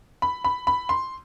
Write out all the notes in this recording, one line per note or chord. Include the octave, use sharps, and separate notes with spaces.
B5
B5
B5
C6